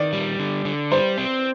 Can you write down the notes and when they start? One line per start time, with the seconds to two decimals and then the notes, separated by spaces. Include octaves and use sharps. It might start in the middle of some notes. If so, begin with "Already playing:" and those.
Already playing: D#3 D5
0.13 G3
0.39 D3
0.65 D3
0.91 G3 C5
1.18 C4